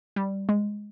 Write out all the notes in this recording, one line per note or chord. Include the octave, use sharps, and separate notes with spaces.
G3
G#3